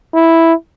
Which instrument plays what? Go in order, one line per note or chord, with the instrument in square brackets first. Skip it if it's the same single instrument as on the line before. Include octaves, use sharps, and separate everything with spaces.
[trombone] E4